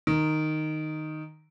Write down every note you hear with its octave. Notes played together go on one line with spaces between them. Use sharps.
D#3